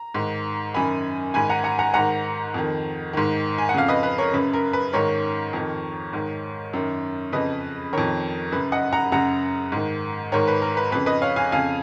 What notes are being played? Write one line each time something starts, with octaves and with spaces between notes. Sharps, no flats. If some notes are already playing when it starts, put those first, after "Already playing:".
Already playing: A#5
G#2 D#3
F#2 D#3 G#5 B5
G#2 D#3 G#5 B5
F#5 A#5
F#5 A#5
F#5 A#5
G#2 D#3 F#5 A#5
F2 D#3
G#2 D#3
G#5
F#5
F2 C#3 F5
B4 D#5
B4
A#4 C#5
F#2 C#3 B4
A#4
B4
G#2 D#3 A#4 C#5
F2 D#3
G#2 D#3
F#2 D#3
F2 C#3 B4 D#5
F2 D#3 A#4 C#5
F#2 C#3 B4
D#5 F#5
F#5 A#5
F#2 C#3 F#5 A#5
G#2 D#3
G#2 D#3 A#4 C#5
B4
A#4
B4
F2 C#3 B4
B4 D#5
C#5 F5
F5 G#5
F2 C#3 F5 G#5